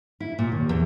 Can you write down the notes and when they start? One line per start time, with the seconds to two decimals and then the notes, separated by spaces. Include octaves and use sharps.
0.20 E4
0.39 A#2
0.52 D#2
0.69 E2